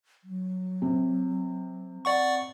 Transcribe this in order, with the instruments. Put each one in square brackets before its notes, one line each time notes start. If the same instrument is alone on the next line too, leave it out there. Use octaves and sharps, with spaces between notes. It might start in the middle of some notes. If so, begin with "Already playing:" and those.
[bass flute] F#3
[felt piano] C3
[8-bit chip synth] D5 F#5 C#6